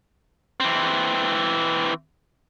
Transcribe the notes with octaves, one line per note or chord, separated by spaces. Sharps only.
E3 C4